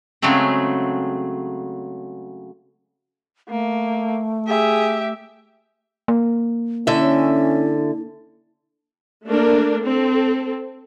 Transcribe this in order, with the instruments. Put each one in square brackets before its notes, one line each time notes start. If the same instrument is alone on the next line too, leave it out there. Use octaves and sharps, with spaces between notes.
[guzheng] C#3 F#3 G#3 A3 C4
[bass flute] A3 [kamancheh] A#3
[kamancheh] G4 E5 [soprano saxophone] G#4
[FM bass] A#3
[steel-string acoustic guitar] D3 E5 [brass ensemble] C#4 [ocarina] E4
[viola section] A3 A#3 D4 A#4
C4 A4